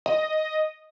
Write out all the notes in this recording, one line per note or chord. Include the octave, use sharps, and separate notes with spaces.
D#5